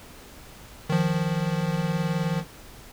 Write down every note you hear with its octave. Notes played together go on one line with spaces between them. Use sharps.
D#3 F3